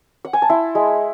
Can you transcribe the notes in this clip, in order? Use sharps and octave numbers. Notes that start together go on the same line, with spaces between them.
F#5
G#5
A5
E4 C6
G#3